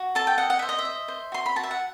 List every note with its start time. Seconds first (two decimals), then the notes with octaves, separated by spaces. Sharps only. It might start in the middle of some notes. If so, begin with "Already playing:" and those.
Already playing: F#4
0.15 A4 A5
0.27 G5
0.38 D#5 F#5
0.50 F#5
0.59 C5 E5
0.69 D#5
0.79 E5
0.85 D#5
1.08 C5
1.32 F#4 C6
1.46 B5
1.56 F#4 A5
1.63 E5
1.71 F#5